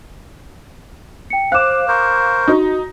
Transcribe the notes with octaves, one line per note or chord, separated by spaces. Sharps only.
G5 C#7
C5 F5 D6 F#6 E7
A#4 C5 C#6
D#4 F#4